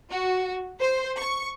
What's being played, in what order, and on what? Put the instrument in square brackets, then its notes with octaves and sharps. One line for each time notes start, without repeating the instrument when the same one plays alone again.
[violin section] F#4
C5
C#6